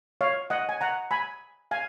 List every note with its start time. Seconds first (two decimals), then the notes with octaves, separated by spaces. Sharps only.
0.21 C#5 F5
0.50 D#5 F#5
0.69 G#5
0.81 F#5 A#5
1.11 G#5 B5
1.71 F5 G#5